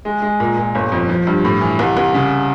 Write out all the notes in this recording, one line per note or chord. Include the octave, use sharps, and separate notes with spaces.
G#3
G#3
A#2
A#2
G1
F2
F3
G2
A2
E3
C2
C2
C#3